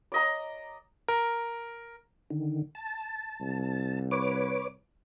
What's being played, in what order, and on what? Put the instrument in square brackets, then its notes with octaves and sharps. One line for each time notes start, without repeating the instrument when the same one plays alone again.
[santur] D5 D#5 A#5
[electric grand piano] A#4
[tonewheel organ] D3 D#3
A5
[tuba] C2
[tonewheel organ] B4 C#5 D6